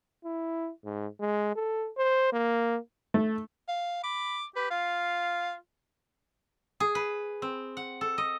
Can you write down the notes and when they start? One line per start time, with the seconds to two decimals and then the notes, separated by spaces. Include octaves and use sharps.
0.25 E4
0.85 G#2
1.20 G#3
1.55 A4
1.97 C5
2.32 A#3
3.14 A3
3.68 F5
4.03 B5 D6
4.56 G4 B4
4.71 F4 F5
6.80 G#4
6.95 B4
7.42 C4
7.77 F#5
8.01 A4
8.18 D#5